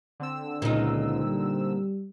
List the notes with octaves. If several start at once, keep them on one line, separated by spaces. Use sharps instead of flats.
D3 C4 E6
C#2 A#2 D#4
G3